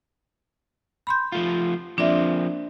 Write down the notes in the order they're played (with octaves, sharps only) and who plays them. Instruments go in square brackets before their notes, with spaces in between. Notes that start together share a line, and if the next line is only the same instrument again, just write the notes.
[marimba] B5 C6 G6
[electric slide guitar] F3 A3 F4
[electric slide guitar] F3 A#3 C4 [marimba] D4 D5 E5